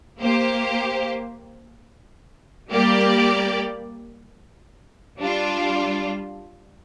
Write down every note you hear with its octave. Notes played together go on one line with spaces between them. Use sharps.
A#3 G4 C5
G3 A#3 G4 D5
G3 D4 F4